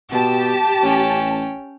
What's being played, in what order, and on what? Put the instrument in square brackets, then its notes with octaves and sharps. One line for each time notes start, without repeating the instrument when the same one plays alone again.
[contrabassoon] B2 [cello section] G4 [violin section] A5
[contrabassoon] A1 [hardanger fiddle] C#4 G5